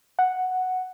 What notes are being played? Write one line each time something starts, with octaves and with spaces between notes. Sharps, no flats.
F#5